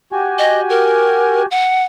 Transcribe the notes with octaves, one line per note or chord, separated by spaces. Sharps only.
F#4 G4 G#5
D#5
A#4
F#5